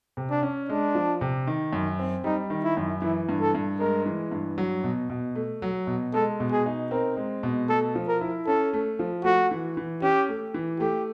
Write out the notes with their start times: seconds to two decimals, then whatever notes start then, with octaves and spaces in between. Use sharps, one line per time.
0.17 C3
0.30 D4
0.43 C#4
0.69 G#3 D4
0.95 F3
1.21 C3
1.47 D#3
1.73 F#2
1.99 C4
2.24 G3 D#4
2.50 D#3
2.64 E4
2.77 F#2
3.02 E3 E4
3.29 G2
3.41 A4
3.55 G2
3.80 G#3 A#4
4.06 E3
4.31 G2
4.58 F#3
4.84 B2
5.10 B2
5.35 A3
5.62 F#3
5.87 B2
6.14 G#3 A4
6.40 B2
6.52 G#4
6.66 D#4
6.91 C4 A#4
7.17 G#3
7.43 B2
7.69 A3 A4
7.95 F3
8.08 A#4
8.21 E4
8.47 C#4 A4
8.73 A3
8.99 F3
9.24 A3 F#4
9.51 E3
9.77 E3
10.02 C#4 G4
10.29 A3
10.54 E3
10.80 A3 G4